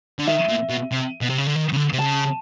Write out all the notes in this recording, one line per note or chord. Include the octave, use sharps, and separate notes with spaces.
D3
D#3 E5
A#2
B2
C3
B2
C3
C#3
D3
D#3
C#3
D3
C3
C#3 A5